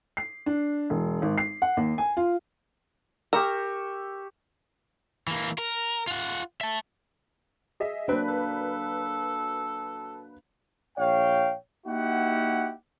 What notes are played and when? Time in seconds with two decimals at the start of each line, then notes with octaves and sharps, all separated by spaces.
0.17 C7
0.46 D4
0.90 E1
1.22 G#1
1.38 C7
1.62 F#5
1.77 D#2
1.98 G#5
2.17 F4
3.33 G4 A#4 C#6 E6
5.27 E3 A#3
5.58 A#4
6.07 F4 F#5
6.61 E5 A5
7.80 G#4 D#5 E5
8.08 F#3 A#3 C4 D4 B4
8.28 A4
10.98 A#1 C#5 F5 G5
11.86 A#3 D#4 E4 F#4 G4 F#5